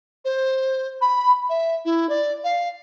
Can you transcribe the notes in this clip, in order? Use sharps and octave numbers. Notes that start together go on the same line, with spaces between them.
C5
B5
E5
E4
D5
F5